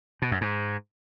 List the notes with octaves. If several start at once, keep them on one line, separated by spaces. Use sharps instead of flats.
B2
F#2
G#2